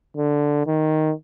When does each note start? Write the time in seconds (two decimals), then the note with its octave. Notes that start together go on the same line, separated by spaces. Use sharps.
0.17 D3
0.67 D#3